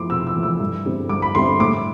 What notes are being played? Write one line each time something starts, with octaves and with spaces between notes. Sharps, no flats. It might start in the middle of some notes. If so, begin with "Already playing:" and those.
Already playing: F3 A3 E4 C6 D6
C3 E6
E6
F3 A3 E4
E6
G2
D3 G3 C4 E4
G2 D6
B5
D3 G3 C4 E4 C6
A2 D6